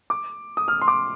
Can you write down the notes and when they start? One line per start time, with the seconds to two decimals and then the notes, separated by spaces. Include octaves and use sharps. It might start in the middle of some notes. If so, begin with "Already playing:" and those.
0.10 D6
0.57 D#6
0.68 F6
0.81 C6
0.88 D6